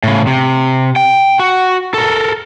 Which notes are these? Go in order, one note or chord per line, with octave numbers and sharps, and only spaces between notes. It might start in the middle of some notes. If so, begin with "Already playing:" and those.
A2 C#3
C3
G5
F#4
A4 A#4